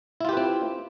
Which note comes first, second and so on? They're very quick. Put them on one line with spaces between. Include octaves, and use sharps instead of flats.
E4 F4 G4 B4 C4